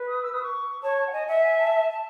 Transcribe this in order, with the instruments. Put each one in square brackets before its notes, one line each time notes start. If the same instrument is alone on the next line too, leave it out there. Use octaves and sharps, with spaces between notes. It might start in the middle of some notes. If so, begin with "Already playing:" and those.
Already playing: [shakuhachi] B4
[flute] D#6
E6
D#6
C#6
[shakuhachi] C#5 [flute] A5
[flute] A5
F#5
[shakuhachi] D#5 [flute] G#5
[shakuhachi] E5 [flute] F#5
[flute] G#5
A5